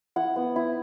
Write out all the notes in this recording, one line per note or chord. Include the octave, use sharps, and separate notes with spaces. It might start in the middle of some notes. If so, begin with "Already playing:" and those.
E4 F#5
B3
E4